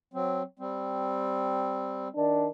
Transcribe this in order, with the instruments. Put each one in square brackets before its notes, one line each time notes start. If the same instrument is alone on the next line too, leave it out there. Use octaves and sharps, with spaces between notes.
[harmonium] F#3 C4
G3 C4
[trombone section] D#3 D4